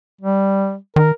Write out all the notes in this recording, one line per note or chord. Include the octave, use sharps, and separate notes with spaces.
G3
D#3 A#4